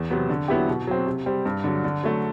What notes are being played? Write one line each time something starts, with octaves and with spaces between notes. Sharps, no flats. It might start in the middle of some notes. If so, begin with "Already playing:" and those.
Already playing: E2
C3 F#3 B3
D3
F#3 B3 E4 G4
B2
F#3 C4
C3
G3 C4
G2
D3 F#3
D3
F#3 A3